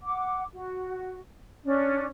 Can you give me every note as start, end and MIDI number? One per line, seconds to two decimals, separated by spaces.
0.03 0.44 78
0.03 0.44 86
0.54 1.20 66
1.64 2.05 61
1.64 2.05 62